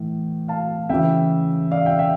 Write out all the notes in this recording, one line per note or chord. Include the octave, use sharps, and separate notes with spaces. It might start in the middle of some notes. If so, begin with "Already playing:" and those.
Already playing: A2 E3
F5 A5
C#3 E3 E5 G5
D5 F5
E5 G5
E5 G5